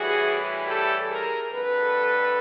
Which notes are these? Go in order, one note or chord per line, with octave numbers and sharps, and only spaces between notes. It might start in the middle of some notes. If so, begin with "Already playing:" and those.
Already playing: A2 E3 G3 F#4 G#4
G4 A4
G#4 A#4
F2 D3 G3 A4 B4